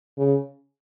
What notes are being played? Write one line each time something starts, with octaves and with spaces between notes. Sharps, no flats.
C#3